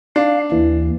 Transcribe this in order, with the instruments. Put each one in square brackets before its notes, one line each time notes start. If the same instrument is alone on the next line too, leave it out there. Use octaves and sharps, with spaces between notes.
[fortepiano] D4 [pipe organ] F5
[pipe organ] D#2 [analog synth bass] E3